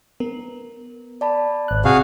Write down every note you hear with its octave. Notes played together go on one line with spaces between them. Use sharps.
B3 A#4
D5 A5 B5
G#1 F#6
C3 F#4 G#4 F5